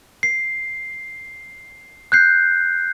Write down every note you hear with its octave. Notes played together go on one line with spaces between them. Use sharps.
C7
F#6 G6 C7